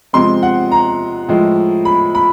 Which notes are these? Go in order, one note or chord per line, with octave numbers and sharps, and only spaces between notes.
C3 F3 G#3 C4 C6
F#5
A#5
A2 F3 G#3
B5
B5